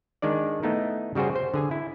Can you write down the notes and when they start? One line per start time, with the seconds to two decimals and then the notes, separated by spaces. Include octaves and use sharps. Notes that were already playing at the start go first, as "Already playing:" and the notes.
0.22 D#3 G#3 D4 D5
0.63 A3 B3 D#4 E4
1.15 C#3 G3 F#4 G#4 C5
1.36 C5
1.54 D3 G#4 G#5
1.71 E4